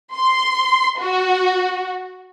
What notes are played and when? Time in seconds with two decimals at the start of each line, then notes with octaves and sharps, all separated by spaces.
0.14 C6
1.01 F#4